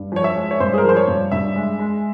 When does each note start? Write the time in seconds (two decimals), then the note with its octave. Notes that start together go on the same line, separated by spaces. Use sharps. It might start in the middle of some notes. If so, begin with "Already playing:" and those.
Already playing: G2
0.12 F3 C#5
0.24 E5
0.36 G#3
0.51 C#5
0.60 G2 C5
0.74 G#4
0.78 A#4
0.83 F3
0.89 C5
0.96 C#5
1.08 G2
1.31 G2 E5
1.56 G#3
1.79 G#3